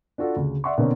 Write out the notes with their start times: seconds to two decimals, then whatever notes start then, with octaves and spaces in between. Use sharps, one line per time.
0.18 D4 F4 F#4 A4
0.36 D2 C#3
0.64 D5 E5 F#5 C6 C#6
0.78 B2 D3 A#3 C4 C#4